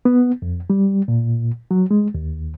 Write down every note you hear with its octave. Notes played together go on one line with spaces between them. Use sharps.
B3
F2
G3
A#2
F#3
G#3
D#2